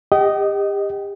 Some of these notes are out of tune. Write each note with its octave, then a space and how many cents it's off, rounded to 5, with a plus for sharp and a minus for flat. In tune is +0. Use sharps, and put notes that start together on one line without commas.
G4 +35 D#5 +0 G5 -40